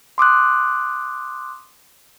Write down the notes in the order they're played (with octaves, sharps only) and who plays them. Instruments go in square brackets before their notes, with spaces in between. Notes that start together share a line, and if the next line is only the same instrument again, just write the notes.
[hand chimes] C6 D6 D#6 F#6